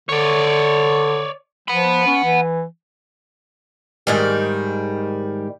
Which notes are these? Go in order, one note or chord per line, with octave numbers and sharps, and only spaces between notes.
D3 C#5 D5
F3 F#5 B5
C#4
E3
G#2 D#3 G3